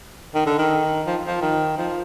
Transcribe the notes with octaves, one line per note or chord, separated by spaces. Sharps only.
D#3
D3
D#3
F3
F3
D#3
F3